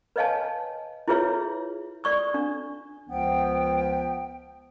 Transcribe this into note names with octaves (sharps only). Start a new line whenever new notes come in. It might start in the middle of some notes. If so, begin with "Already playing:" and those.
B4 C#5 D#5 F5 G#5 A5
E4 F4 G#4 B4 C#5 E5
D5 C#6 D#6
D4
C#2 F3 B3 G5